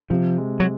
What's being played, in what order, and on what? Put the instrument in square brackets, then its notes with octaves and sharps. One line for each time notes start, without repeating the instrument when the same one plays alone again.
[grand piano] C3 [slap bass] F3
[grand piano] G#3
[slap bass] F#3